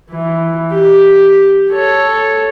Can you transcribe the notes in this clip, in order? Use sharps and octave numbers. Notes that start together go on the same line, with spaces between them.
E3
G4
A4 C#5